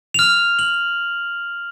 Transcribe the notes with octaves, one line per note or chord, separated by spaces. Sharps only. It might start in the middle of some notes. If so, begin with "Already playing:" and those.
F6 F7
F#7